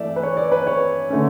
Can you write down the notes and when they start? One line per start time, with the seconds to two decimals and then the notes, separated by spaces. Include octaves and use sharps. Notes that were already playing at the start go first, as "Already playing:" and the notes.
Already playing: E3 A3 D5 E5
0.16 B4
0.23 C#5
0.37 D5
0.52 B4
0.67 C#5
1.10 D3 A3 C#4